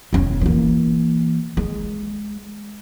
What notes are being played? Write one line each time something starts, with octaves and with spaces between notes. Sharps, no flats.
E1 C#4
E3 A#3
G#3